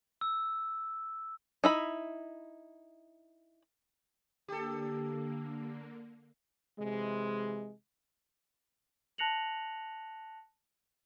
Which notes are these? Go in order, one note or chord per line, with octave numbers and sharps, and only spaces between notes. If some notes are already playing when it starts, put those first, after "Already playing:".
E6
D#4 E4 B5
D3 A#3 G4 A4
C3 E3 G#3
A5 F#6 A#6 C#7 F7 F#7